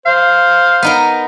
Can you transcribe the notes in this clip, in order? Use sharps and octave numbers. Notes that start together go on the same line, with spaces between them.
C5 F5
B3 D#4 A#4